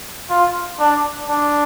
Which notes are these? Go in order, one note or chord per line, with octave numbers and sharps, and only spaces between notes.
F4
D4
D4